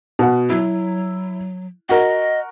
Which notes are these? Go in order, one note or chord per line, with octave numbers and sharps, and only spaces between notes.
B2 F#5
F#3 E4
F#4 A#4 D#5